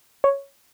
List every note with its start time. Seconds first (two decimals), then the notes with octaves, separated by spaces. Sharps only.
0.24 C#5